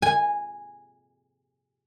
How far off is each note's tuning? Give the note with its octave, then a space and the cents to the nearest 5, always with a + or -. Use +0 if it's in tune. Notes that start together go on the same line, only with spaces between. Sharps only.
G#5 -10